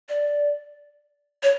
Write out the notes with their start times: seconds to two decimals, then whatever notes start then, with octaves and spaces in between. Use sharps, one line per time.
0.09 D5
1.43 C#5